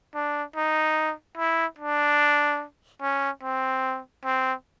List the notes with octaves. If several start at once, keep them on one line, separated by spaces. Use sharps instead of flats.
D4
D#4
E4
D4
C#4
C4
C4